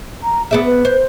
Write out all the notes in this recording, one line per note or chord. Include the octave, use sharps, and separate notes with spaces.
A#5
B3 G#4 D5 E5
B4
C5